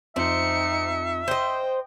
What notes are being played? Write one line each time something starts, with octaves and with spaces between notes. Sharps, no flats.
F2 C4 D#4 E5 C#7
C5 D#5 G5